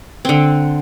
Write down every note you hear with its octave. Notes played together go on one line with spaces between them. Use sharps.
D3 C4